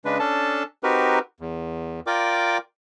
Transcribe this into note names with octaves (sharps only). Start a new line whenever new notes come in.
C#3 G#3 D4 B4
C#4 D4 A4 A5
C4 D#4 F#4 G4 A#4 B4
E2
F4 A#4 D5 G5 D6